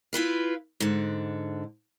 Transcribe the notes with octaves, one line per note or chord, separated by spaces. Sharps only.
E4 F4 B4 F5
G#2 D3